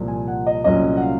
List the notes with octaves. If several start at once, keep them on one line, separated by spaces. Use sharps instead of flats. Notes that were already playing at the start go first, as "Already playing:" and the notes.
Already playing: C2 A#2 F3
G#5
F#5
D#5
C2 A#2 F#3 C#4 D#5
F#5
F5